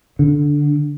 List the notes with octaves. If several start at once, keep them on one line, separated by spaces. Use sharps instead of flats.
D3